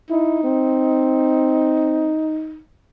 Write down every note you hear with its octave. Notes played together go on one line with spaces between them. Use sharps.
D#4 E4
C4